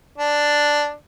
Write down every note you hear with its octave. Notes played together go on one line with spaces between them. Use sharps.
D4